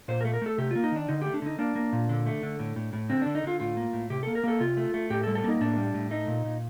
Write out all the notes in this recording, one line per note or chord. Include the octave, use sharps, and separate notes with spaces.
A#2 C5
A#4
A3
A#4
A3 A4
C3 G4
A#3 F4
D#4
D#3 D4
D3 D#4
A3 G4
D4
D3 D#4
A#3 D4
A#3
A#2
D3
A3
D3
A2
A2
A2
D3 C4
D3 D4
D#4
D3 F4
A2 F4
A#3
A2
C3 G4
A#3 A4
A#4
A#3 A4
C3 F4
A3
A3
A2 G4
A4
G3
A4
A#3 D#4
A2 D4
G3
A2
A3 D#4
A#2
A#2